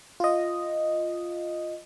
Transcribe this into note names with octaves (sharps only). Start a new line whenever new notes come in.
F4 D#5